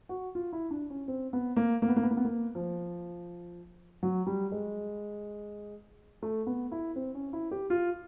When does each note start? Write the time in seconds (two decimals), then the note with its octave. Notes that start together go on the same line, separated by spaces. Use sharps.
0.09 F#4
0.35 F4
0.53 E4
0.71 D4
0.90 C#4
1.08 C4
1.33 B3
1.56 A#3
1.82 A#3
1.88 B3
1.96 A#3
2.03 B3
2.11 A#3
2.17 B3
2.25 A#3
2.55 F3
4.03 F#3
4.27 G3
4.52 G#3
6.22 A3
6.47 B3
6.72 E4
6.96 C4
7.14 C#4
7.33 E4
7.51 G4
7.70 F4